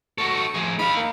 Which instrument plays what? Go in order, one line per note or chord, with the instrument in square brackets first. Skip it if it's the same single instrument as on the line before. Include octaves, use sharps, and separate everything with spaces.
[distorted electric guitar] F#4 A4 [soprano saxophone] C#6
[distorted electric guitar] F3 G#4
[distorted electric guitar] D#4 F5 [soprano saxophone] B5
[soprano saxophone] A#3